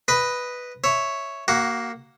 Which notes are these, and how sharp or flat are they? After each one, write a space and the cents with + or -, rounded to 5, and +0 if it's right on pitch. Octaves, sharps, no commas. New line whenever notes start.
B4 +0 D#5 +0 B5 +0
C#5 +0 E5 +0
A#3 +0 F#4 +25 F#5 +0